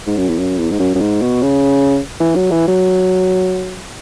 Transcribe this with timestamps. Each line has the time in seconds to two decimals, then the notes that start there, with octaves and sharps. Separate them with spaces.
0.07 G#2
0.17 F#2
0.29 E2
0.38 F#2
0.58 E2
0.71 G#2
0.79 F#2
0.95 F#2
1.01 G#2
1.22 B2
1.42 C#3
2.20 E3
2.35 F#3
2.51 E3
2.68 F#3